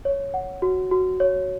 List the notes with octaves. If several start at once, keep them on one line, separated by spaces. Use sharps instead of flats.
C#5
F#5
F#4
F#4
C#5